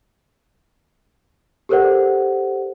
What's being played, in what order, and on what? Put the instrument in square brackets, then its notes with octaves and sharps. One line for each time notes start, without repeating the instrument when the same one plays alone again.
[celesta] G4 A4 A#4 C5 D5 F#5